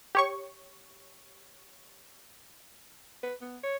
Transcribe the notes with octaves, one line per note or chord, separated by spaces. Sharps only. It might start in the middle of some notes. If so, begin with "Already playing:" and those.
G4 C#5 C#6
B4
B3
C#5